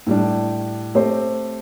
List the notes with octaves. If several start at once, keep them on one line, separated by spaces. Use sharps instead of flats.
A2 G3 D4
A3 C4 G4 C5